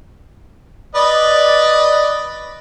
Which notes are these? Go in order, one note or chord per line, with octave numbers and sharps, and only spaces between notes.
B4 D5 D#5